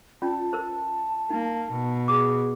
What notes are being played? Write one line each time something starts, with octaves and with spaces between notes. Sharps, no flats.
C#4 F4 D5 A5
A#4 C5
A#3 D#4
B2
G#4 D6